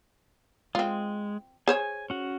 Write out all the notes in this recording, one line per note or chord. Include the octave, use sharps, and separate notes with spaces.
G#3 C4 F4
G#4 C5 C#5 G#5
C#4 F#4